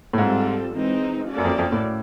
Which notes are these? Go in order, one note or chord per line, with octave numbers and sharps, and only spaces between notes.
A2
G#2 G3 C4 F4 A4
E3 G#3 C4 D#4
A#3 C#4 F#4 A4 D5
F#2
F2
F2
A2